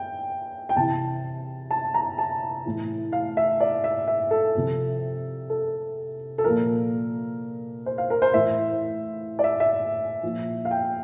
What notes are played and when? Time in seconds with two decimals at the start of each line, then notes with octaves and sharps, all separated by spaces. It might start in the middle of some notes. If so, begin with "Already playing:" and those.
Already playing: G5
0.69 G5
0.76 C3 E3 A5
1.71 A5
1.94 A#5
2.18 A5
2.66 A2 E3
3.13 F5
3.37 E5
3.60 D5
3.84 E5
4.08 E5
4.31 A4
4.55 C3 F3
5.50 A4
6.38 A4
6.44 A#2 F3 A#4
7.86 C5
7.98 F5
8.10 A#4
8.22 C5
8.34 A2 E3 E5
9.39 D5
9.44 E5
9.60 E5
10.23 A#2 F3
10.65 F5
10.71 G5